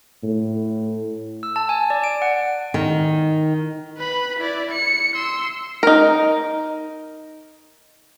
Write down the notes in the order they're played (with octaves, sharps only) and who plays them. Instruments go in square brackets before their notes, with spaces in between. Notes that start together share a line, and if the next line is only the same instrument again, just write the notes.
[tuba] A2
[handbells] E6
A5
G#5
D5
D7
F#5
[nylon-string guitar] D#3
[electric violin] B4 B5
E4 D5
C#7
C6 E6
[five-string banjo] D#4 A#4